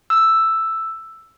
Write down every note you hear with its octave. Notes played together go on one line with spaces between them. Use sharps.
E6